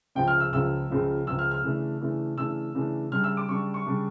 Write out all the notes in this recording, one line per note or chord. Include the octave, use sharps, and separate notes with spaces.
C#2 C#3 F3 G5
F6
E6
C#2 C#3 F3 E6
C#2 C#3 F3
C#2 C#3 F3 E6
F6
F6
C#3 E3 A3 D4
C#3 E3 A3 D4
C#3 E3 A3 D4 E6
C#3 E3 A3 D4
C#3 G3 D4 F6
E6
D6
C#3 G3 D4 C#6
C#6
C#3 G3 D4